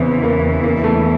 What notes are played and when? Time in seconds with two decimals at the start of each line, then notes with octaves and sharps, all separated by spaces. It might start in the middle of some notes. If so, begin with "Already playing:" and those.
Already playing: E2 C#3 E3 B3 C4
0.23 A#3
0.63 A#3
0.84 A3